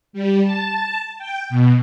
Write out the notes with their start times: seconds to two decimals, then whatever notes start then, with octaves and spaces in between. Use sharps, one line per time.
0.13 G3
0.43 A5
1.18 G5
1.49 B2